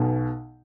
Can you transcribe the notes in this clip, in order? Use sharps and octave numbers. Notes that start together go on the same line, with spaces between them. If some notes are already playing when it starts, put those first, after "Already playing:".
Already playing: B1 B2